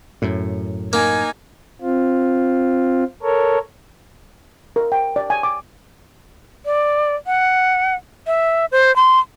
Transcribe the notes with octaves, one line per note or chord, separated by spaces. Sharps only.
F#2 A2
A#3 D#4 G#5
C4 F4
A4 A#4 C#5
A#4
G5
D5
G#5
D6
D5
F#5
E5
C5
C6